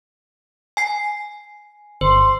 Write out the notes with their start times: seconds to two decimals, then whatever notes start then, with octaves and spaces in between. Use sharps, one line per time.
0.77 G#5 C7
2.01 G1 C5 C6